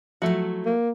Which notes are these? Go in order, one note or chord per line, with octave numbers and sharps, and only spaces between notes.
F3 F#3 A3 E4 F#4
A#3